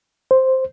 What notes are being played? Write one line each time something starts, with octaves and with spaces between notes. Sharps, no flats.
C5